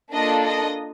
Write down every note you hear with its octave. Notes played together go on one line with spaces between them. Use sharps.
A#3 D4 F4 A4 D#5
D#5